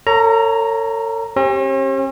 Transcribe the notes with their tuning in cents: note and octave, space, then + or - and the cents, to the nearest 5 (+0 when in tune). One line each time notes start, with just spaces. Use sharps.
A4 +45 C#5 +0 A#5 +5
C#4 -45 G4 +0